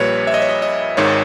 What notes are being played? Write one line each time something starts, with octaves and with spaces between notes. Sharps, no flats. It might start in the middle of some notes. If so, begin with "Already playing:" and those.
Already playing: A#1 A#2 G3 B4 C#5
E5
D#5
C#5
D#5
D#5
G#1 G#2 D#3 C#5